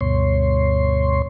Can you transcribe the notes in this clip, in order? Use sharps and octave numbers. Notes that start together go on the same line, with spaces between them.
D2 G2 B2 C#5 C6